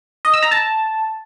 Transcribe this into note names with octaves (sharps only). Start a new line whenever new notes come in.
D#5
E6
A#5
A5